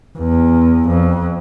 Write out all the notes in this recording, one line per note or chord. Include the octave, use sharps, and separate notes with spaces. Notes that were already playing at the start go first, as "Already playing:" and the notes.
E2
F2